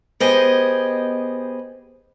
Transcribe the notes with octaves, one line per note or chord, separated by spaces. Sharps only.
B3 G4 G#4 C5 D#5